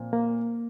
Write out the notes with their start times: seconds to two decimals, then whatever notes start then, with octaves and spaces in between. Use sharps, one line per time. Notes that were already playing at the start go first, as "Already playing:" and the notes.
Already playing: A#2 F3 C4
0.13 A#3